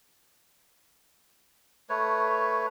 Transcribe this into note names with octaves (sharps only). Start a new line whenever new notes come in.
A3 B4 C#5